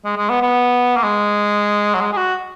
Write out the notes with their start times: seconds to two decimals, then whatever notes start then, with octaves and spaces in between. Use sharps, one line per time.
0.05 G#3
0.17 G#3
0.30 B3
0.42 B3
0.96 A#3
1.03 G#3
1.94 F#3
2.01 G#3
2.13 G#4
2.17 F#4